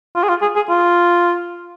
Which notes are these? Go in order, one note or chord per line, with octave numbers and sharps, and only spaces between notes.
F4
G#4
F4
G#4
G#4
F4